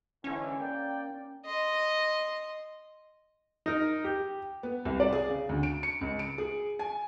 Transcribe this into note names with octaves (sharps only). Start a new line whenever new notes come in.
G#2 D3 E3 C#4
A#3 D5 G5
D#5 C6
D#4 A#4
G4
B3
C2
D5
G#4
C#3
D2
D7
C#7
C#2
D7
G#4
G#5